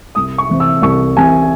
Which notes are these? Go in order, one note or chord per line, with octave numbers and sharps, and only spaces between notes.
C2 D#6
C#6
C3 E3 C4
E6
C2 C#6
C3 E3 C4 G#5